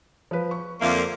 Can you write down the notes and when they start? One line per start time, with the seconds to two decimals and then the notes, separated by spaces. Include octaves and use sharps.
0.31 F3 B4
0.51 C#6
0.81 F2 D3 A#3 E5 D6